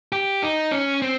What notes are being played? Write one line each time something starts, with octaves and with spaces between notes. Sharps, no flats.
G4
D#4
C#4
C4